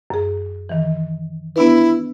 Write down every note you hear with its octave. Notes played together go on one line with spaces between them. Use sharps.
F#2 G#4
D#3 E3
B3 D4 E4 B4